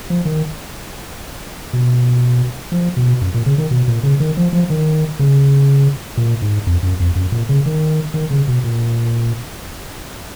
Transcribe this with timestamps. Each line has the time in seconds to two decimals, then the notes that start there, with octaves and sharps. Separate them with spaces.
0.10 F3
0.25 D#3
1.73 B2
2.72 F3
2.97 B2
3.21 F#2
3.34 A#2
3.46 C#3
3.58 D#3
3.71 B2
3.88 A#2
4.03 C#3
4.20 D#3
4.37 F3
4.53 F3
4.70 D#3
5.19 C#3
6.17 A#2
6.42 G#2
6.67 F2
6.83 F#2
7.00 F2
7.15 F#2
7.32 A#2
7.49 C#3
7.66 D#3
8.14 D#3
8.31 C#3
8.48 B2
8.64 A#2